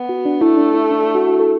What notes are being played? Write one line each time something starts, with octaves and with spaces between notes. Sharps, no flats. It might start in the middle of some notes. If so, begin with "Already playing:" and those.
Already playing: B3
F#4
D4
A3 E4
D4
E4
D4
E4
F#4
F#4
A4